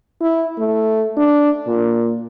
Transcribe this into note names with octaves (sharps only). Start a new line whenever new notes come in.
E4
A3
D4
A#2